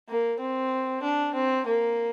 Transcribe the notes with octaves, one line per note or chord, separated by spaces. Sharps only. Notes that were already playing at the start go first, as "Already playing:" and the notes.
A#3
C4
D4
C4
A#3